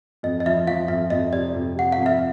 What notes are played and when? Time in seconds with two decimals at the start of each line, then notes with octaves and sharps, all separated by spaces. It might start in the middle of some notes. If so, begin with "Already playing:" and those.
0.23 F2 D#5
0.40 D#5
0.46 F3 E5
0.67 F3 F5
0.88 F2 E5
1.10 F2 D#5
1.32 C3 D5
1.55 F2
1.75 C3 F#5
1.92 F5
1.98 F2
2.06 E5